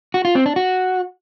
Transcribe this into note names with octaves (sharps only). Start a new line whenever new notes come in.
F#4
F4
C4
D4
F#4